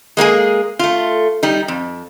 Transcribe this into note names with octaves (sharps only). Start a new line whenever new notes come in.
G#3 A#3 G4 G#4
A3 F4
G3 D#4
F2